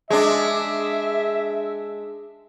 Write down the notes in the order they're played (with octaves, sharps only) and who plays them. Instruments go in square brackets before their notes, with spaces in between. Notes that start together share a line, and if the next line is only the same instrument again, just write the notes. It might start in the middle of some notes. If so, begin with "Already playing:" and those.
[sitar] G#3 D4 [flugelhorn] E5